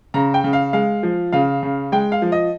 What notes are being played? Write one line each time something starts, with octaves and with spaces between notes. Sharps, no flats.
C#3 A#5
G5
C#3
F5
G#3 F5
F3
C#3 F5
C#3
G#3 G5
F5
F3
D#5